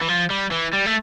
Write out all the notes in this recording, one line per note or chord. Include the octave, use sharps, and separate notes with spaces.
E3
F3
G3
E3
G3
A3